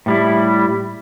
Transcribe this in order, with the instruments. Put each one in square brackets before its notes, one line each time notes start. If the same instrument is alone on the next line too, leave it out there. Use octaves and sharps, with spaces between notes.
[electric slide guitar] A2 G3 E4